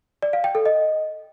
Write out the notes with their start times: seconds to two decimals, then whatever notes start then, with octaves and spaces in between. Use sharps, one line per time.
0.22 D5
0.33 F5
0.44 G5
0.55 A4
0.66 D#5